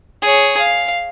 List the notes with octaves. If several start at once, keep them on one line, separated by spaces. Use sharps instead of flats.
G#4 C#5
F5